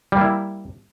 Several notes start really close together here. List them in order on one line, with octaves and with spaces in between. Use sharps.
G3 A#3 E4